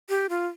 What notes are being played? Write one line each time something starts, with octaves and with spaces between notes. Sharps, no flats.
G4
F4